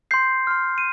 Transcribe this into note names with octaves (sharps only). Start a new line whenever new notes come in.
C6 G6 C7
C6 F6
D#7